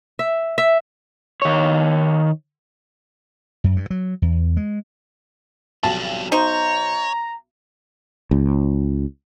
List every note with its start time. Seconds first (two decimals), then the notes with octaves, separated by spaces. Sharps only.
0.19 E5
0.58 E5
1.42 D#3 C#5
3.64 F#2
3.76 G2
3.90 F#3
4.22 E2
4.57 G#3
5.83 B1 F2 G3 A5
6.32 D#4 C5 C#5 A#5
8.31 C#2